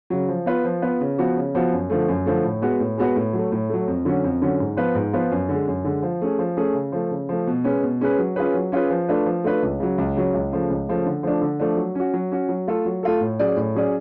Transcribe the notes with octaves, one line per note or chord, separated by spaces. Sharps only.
C#3 F#3
F3
B3 F4 B4
F3
B3 F4 B4
C#3
F3 B3 F#4
C#3
F3 B3 F#4
F#2
D3 F3 A3
F#2
D3 F3 A3
A2
G#3 B3 F#4 B4
A2
G#3 B3 F#4 B4
A2
F#3 A3
A2
F#3 A3
F2
D3 F#3 C#4
F2
D3 F#3 C#4
G#2
F3 B3 F4 B4
G#2
F3 B3 F4 B4
F#2
D3 G#3
F#2
D3 G#3
F3
A3 C#4 G#4
F3
A3 C#4 G#4
C#3
F3 A3
C#3
F3 A3
B2
G#3 C#4 G#4 B4
B2
G#3 C#4 G#4 B4
F#3
C#4 F4 G#4 B4
F#3
C#4 F4 G#4 B4
F3
A3 D4 F4 B4
F3
A3 D4 F4 B4
C#2
C#3 F#3
C#2
C#3 F#3
C#2
C#3 F3 A3
C#2
C#3 F3 A3
D3
F3 A3 D4
D3
F3 A3 D4
F#3
C#4 F#4
F#3
C#4 F#4
F#3
A3 F4 A4
F#3
A3 F4 A4
A2
F#3 C#4 G#4 D5
A2
F#3 C#4 G#4 D5